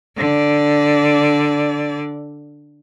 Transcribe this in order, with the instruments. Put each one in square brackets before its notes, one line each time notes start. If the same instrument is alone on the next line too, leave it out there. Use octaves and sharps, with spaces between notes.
[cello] D3 D5